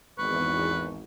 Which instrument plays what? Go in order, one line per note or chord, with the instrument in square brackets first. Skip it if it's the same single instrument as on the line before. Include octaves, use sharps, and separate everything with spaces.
[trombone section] G#1 [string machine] E2 [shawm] B4 [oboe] C#6